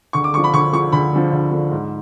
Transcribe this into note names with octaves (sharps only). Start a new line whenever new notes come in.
D2 C#6
D6
D3 F3 C#6
B5
D2 C#6
D3 F3 C#6
D2 B5
D3 F3
D2
D3 F3
G#2